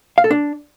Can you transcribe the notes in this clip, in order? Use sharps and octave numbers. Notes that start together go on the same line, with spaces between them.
F5
A4
D4